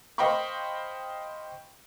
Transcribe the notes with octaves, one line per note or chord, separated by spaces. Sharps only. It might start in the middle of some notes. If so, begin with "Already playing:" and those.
C5 D#5 F5 G5 B5 C#6